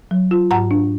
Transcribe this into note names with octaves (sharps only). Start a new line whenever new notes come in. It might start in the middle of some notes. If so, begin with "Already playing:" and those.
F#3
F4
G#2 F#5 A#5
D4